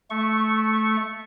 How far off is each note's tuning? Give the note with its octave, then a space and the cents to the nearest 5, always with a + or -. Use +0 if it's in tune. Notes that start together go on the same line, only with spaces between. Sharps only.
A3 -10 C#6 -5